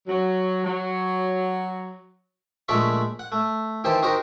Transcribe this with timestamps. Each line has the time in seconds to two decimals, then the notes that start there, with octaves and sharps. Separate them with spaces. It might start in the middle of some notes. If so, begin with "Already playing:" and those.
0.07 F#3
0.64 F#3
2.68 A#1 G#3 A3 D5 B5 C#6
3.19 F#5
3.32 A3
3.84 D#3 E3 G4 C5 G5 A5
4.02 D#4 F#4 G4 A#4 C5